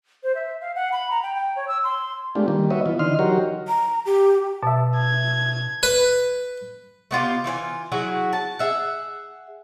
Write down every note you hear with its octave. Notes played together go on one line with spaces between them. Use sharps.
C5
E5
F5
F#5
B5
A#5
G5
G5
C#5
E6
C6
G#3 A3 B3 D4 F4 G4
D#3 G3 A#3
F#4 B4 C#5 D#5 E5
E3 B3 F4
D3 E3 D#4 D#5 C6 F6
F#3 D#4 F#4 G4 A#4 C#5
A#5
G4
B2 E5 A5
G#6
B4
A3 B3 F4 G4
E3 F4 C5 G#5
F#3 E4 F#4 G#4
A5
G#4 E5 F#5